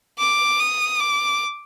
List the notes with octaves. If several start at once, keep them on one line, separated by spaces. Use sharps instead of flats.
D6
D#6
D6